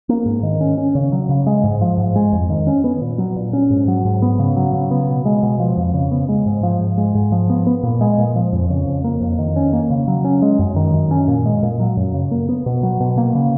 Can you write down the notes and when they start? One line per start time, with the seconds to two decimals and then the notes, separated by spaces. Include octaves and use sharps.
0.09 A#3
0.26 G#2
0.43 D#3
0.61 C#4
0.78 C#4
0.95 C#3
1.12 F#3
1.29 C#3
1.46 G#3
1.64 G#2
1.81 F3
1.98 G#2
2.16 G#3
2.33 F2
2.50 D#3
2.67 C#4
2.84 B3
3.01 A#2
3.18 F#3
3.36 A#2
3.53 C#4
3.70 G#2
3.88 F#3
4.05 G#2
4.22 B3
4.39 C#3
4.56 F#3
4.74 C#3
4.91 B3
5.09 B2
5.25 G#3
5.43 B2
5.60 F3
5.77 F2
5.94 C#3
6.11 B3
6.29 G#3
6.46 G#2
6.63 F3
6.80 G#2
6.97 G#3
7.15 G#2
7.32 F3
7.50 B3
7.66 B3
7.83 A#2
8.01 G#3
8.18 A#2
8.35 F3
8.53 F2
8.70 C#3
8.87 F2
9.04 A#3
9.21 F2
9.38 D#3
9.56 C#4
9.73 A#3
9.90 C#3
10.08 F#3
10.24 C#4
10.42 G#3
10.59 F#2
10.76 D#3
10.94 F#2
11.11 C#4
11.28 A#2
11.46 G#3
11.63 A#2
11.80 F#3
11.97 F#2
12.14 C#3
12.31 A#3
12.49 B3
12.66 B2
12.83 F#3
13.00 B2
13.18 A#3
13.35 C#3